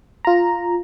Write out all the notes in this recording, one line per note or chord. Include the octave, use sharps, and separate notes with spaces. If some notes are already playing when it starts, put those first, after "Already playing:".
F4 A#5